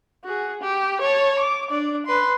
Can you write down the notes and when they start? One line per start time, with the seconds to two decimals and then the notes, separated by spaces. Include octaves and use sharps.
0.24 F#4 G#4
0.61 G4
1.01 C#5 A5
1.39 D6
1.70 D4 D5
2.07 B4 C6